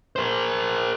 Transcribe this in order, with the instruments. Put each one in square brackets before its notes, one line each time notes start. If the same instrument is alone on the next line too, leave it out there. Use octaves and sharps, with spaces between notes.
[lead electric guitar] A#4 C5